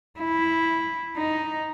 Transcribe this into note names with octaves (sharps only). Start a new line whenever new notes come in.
E4
D#4